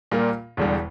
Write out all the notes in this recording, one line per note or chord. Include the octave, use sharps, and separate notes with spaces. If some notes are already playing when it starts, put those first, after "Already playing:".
A#2 G3 A#3 F4
E1 E2 D3 G3